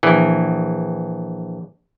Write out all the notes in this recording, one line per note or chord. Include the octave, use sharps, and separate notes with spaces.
A#1 E3